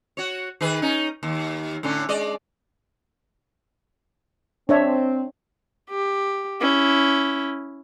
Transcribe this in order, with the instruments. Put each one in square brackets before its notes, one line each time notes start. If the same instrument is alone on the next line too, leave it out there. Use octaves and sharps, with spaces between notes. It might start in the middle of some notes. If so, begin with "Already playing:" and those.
[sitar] F#4 C#5
D#3 G#4 B4
C#4 D#4
D#2
A2 D3 C#4
G#3 D5 D#5
[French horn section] C4 [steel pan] D4 C#5 E5
[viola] G4
C#4 E4